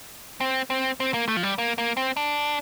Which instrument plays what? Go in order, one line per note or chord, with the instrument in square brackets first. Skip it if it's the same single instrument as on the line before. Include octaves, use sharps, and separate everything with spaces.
[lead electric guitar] C4
C4
C4
A#3
A3
F3
G3
A#3
A#3
C4
D4